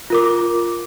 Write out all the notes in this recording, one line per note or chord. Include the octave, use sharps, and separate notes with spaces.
F4 A#4 D6